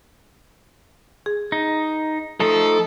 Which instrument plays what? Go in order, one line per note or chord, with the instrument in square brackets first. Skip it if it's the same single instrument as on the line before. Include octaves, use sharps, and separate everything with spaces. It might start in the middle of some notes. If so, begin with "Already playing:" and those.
[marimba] G#4
[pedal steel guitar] D#4
[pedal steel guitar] F3 A3 D#4 [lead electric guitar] A4